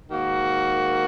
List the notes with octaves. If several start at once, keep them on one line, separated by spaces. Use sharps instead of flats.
G#2 D#3 A#3 F#4